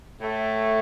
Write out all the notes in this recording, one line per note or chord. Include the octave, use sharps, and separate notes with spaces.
A2 A3